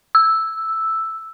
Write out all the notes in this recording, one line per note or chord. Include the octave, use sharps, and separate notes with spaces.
E6